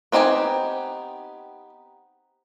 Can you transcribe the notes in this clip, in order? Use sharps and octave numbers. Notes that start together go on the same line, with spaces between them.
B3 C4 D#4 G4 G#5